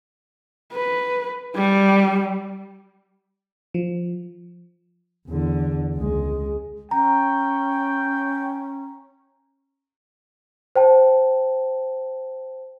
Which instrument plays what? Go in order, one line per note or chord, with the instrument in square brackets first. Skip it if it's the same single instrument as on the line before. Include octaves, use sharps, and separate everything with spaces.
[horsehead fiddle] B4
G3
[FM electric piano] F3
[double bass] E2 D3
C#2 G#3
[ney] C#4 [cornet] G5 [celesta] A#5
[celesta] C5 G5 A5